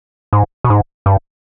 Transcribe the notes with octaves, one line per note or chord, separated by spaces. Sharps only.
G#2
B2
G#2
G2